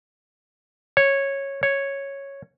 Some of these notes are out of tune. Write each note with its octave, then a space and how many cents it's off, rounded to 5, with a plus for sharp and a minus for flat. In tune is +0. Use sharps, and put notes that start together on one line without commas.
C#5 -10
C#5 -5